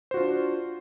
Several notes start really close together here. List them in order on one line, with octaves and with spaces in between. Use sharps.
C5 F#4 F4 D4